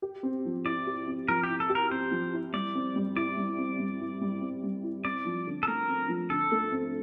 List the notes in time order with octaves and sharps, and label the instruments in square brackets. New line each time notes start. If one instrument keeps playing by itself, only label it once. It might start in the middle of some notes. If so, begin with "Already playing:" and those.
[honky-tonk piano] G4
C4
F3
[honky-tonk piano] E4 [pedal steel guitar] D5
[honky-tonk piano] G4
C4
[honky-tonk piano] F3 [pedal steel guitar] A#4
[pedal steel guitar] G4
[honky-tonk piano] E4
[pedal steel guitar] A4
[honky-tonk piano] G4
[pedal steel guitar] A#4
[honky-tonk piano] C4 [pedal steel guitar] C5
[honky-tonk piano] F3
E4
[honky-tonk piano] G3 [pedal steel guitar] D5
[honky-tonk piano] C4
G3
[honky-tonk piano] E4 [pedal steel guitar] D5
[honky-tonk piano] G3
C4
G3
E4
G3
C4
G3
E4
[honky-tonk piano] C4 [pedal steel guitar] D5
[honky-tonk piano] F3
D3
[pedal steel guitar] A4
[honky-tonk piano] A3 [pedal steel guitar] A#4
[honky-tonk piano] C4
F3
[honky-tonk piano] D3 [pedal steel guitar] A4
[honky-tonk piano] A3
C4